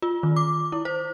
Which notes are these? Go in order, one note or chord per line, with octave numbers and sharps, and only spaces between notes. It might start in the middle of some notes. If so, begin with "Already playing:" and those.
F4
D#3
D6
E4
C5